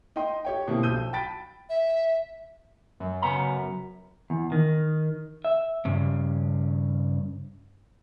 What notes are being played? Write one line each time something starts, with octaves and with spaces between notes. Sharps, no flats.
D#4 D#5 G5 C6
G4 C#5 G5
B2 D3 A#3 C4 E4 G4
B1 F3 A5 E6 G6 D#7
G5 A5 B5 A6 B6 D7
E5
F#2
C#3 B3 A#5
E2
D#3
E5
G2 C#3